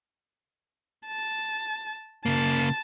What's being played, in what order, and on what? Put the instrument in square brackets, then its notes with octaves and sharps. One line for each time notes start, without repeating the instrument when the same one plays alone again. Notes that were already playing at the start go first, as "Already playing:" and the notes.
[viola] A5
[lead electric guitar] C#3 A#3 [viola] A5